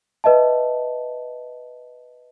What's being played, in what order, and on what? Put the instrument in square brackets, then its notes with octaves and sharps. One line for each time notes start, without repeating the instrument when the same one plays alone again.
[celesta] B4 D#5 E5 A5